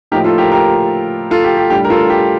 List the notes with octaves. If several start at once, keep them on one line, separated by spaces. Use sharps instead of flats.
A2 F3 A#3 D#4 G4 A#4
F4 A4
G4 A#4
G4 A#4
F4 A4
G4
G4
A2 G3 D4 G4
A#4
F4 A4
G4